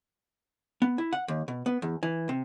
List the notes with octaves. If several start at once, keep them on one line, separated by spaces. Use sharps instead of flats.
B3
E4
F#5
D#2
B2
B3
E2
E3
C3